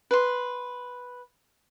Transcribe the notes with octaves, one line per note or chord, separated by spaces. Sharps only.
B4 C6